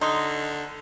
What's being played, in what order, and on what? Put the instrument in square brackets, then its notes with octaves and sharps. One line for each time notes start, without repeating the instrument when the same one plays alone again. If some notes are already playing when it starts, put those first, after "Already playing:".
[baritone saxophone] D3 [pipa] D#4 [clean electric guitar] C6